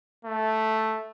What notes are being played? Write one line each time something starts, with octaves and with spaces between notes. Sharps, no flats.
A3